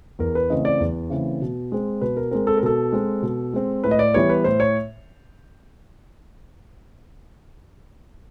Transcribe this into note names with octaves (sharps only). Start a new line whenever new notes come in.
E2 A#4
B4
C#3 E3 A3 C4 D#5
D5
E2
C#3 E3 A3 C4
B2
G#3 C4
B2 B4
A#4
G#3 C4 A#4
A4
A#4
B2 A4
G#3 C4
B2
G#3 C4
A2 B4
D#5
D5
E3 G3 B3 C#5
B4
A2 C5
C#5